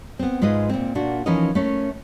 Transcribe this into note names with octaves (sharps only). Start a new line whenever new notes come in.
B3 C4
G#2 G#3 F4 B4 D#5
A#2 C4
A#2 A#3 D4 F#4
E3 F3 C#4 D#4 A#4 D#5
A3 C#4 A#4